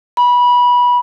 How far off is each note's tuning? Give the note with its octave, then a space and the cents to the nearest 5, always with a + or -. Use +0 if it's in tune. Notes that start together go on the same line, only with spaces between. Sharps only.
B5 -20